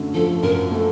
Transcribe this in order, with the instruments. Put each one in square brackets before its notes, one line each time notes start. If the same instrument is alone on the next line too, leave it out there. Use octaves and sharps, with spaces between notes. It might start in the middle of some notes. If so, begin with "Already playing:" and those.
Already playing: [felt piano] F#2 D3 A3
[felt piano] F3 [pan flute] A4
[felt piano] F#2 [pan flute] A#4
[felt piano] A3 [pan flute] A4